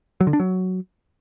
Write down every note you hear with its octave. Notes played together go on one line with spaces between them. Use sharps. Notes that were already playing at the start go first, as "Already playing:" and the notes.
F#3
D3
D4
F#3